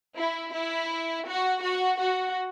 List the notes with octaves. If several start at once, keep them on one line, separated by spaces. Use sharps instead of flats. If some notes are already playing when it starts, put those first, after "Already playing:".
E4
E4
F#4
F#4
F#4